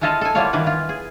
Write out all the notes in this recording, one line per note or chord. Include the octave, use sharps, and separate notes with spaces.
G#3 E4 F4 A4 D#5 F5
A4 G#5
G3 A#3 B3 E4 F4 C#5
D#3 E3 G3 B4
E3 F4
G#4